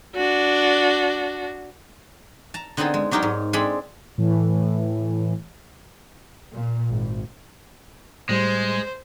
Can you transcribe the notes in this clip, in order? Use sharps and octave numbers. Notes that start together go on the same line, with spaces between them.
D4 F#4
A5 A#5
D3 B3 C4 D#4 G#4 A4
G#3
F#3 D4 D#4 G4 A#4 C#5
G#2
G#3 C4 D4 G#4 A4 B5
A2 E3
A#2
G#1
A2 G3 G#3 C5